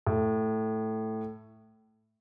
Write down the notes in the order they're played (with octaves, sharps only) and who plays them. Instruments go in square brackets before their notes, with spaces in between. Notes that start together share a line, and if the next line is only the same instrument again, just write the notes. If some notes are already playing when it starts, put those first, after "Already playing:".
[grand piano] A2